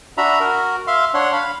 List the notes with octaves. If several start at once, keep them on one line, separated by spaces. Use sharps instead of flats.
D4 F#4 E5 A#5 B5
F#4 A#4
E5 F5 C6
D4 C#5 F#5 C6
F5 B5